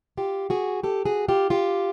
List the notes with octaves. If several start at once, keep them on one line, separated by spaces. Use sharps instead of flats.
F4 G4
F#4 G#4
G4 A4
F#4 G#4
F4 G4
F4 G4